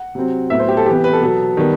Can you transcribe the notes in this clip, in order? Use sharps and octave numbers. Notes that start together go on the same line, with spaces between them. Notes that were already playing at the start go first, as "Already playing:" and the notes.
Already playing: F#5
C3 F#3 C4
A2 F#3 B3 E5
C5
G4
A4
C3 E3 B3 G4
B4
A4
B2 F#3 B3
D#3 G3 B3